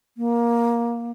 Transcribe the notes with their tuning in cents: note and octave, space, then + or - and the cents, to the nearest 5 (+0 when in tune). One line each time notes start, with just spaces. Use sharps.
A#3 +15